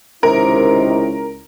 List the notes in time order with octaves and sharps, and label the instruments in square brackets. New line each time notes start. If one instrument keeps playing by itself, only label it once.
[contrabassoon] C#2 [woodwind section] C3 D#3 [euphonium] E4 [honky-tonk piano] A#4